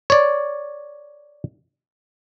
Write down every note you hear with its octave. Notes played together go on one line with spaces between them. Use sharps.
C#5 D5